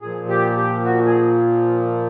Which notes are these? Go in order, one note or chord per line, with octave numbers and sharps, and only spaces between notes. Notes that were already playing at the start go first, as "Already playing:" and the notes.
A#2 F3 G#4
G4
G4
F#4
G#4